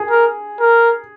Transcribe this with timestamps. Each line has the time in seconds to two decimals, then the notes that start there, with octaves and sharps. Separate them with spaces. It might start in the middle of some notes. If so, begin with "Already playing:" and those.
Already playing: G#4
0.10 A#4
0.60 A#4